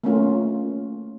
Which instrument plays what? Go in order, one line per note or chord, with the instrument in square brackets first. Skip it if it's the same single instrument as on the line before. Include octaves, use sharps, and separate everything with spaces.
[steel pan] A3 A#3 C#4 F4